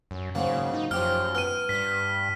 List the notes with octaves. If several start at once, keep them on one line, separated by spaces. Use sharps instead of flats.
F#2
G#2 C#3 F#3 A#3
D#4
F#2 F3 G4 A#5 F6
B3 F6 D#7
G2 B6